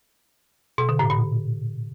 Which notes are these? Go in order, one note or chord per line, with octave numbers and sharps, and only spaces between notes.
B2
D3
A2
A#2